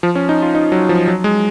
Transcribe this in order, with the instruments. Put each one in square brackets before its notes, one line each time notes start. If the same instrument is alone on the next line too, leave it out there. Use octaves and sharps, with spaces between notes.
[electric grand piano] F3
C#4
D#4
F4
D#4
F#3
F3
F#3
G#3